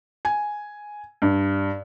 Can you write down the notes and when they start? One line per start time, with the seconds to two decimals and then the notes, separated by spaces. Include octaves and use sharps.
0.25 G#5
1.22 G2